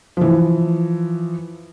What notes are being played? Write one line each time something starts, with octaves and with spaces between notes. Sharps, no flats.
E3 F3